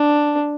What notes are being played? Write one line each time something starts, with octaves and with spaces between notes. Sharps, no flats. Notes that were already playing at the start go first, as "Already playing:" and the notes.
Already playing: D4